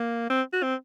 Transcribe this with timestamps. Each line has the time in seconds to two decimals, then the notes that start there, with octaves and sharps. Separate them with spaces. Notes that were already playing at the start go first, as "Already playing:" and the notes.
Already playing: A#3
0.30 C4
0.53 F#4
0.63 C4